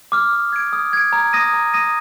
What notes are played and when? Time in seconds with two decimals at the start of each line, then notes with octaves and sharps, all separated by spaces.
0.12 D6 F6
0.33 D#6
0.53 G#6 D7
0.73 D#6
0.93 G#6 D7
1.13 A#5
1.33 D#6 A#6 D#7
1.53 A#5
1.74 D#6 A#6 D#7